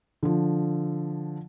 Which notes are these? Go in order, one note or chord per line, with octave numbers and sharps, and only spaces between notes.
D3 F3